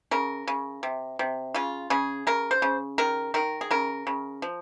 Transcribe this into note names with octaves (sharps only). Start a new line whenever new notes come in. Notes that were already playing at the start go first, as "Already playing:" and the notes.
C#3 A#4
C#3
C3
C3
C#3 F4
C#3 G#4
C#3 A#4
C5
C#3
D#3 A#4
D#3 A#4
G#4
C#3 A#4
C#3
F3